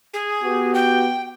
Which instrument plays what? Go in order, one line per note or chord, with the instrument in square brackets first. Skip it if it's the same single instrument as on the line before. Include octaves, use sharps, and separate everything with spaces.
[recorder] G#4
[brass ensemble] B3 F#4 G4
[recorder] G5